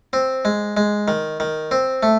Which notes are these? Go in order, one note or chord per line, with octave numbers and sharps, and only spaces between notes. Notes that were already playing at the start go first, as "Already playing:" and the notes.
C4
G#3
G#3
D#3
D#3
C4
A3